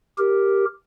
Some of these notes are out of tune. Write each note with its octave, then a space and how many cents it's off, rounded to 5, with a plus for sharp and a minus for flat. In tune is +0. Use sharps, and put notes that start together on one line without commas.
G4 +0 A#4 +0